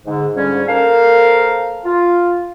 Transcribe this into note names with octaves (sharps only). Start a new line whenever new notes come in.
G#2 D3
G#2 D3 F3 G3 C#4
A#3 A4 A#4 C5 F5
F4